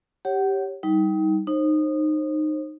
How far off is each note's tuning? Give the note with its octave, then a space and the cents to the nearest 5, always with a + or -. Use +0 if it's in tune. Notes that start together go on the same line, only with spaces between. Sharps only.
G4 +0 C#5 -10 F#5 +25
G3 -15 D#4 +25
D#4 -20 C5 +30